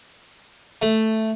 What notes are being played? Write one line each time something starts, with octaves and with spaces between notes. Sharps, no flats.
A3